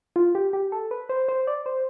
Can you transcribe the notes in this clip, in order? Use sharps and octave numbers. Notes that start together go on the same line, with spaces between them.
F4
G4
G4
A4
B4
C5
C5
D5
C5